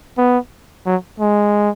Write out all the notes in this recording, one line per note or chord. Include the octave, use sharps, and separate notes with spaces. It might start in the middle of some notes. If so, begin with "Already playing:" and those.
B3
F#3
G#3